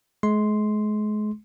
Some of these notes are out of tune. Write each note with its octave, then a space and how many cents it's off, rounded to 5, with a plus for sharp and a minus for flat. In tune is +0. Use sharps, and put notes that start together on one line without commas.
G#3 +35 C6 +0